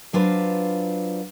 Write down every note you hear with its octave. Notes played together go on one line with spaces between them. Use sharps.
F#3 D4 F4 B4 C5